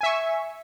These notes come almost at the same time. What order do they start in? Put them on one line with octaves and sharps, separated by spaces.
G#5 E5 C#6